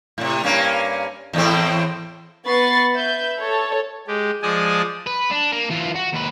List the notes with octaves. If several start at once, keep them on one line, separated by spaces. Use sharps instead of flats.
A2 C3
G2 A#3 C#4
E2 A2 C4
B3 B5 C#6 A6 C7
B4 E5 G6
A4 C#5
G#3 G4
F3 G#3 D5 G#5 A5 D#6
B4
D4
A#3
E3 F4
F#4
D#2 B4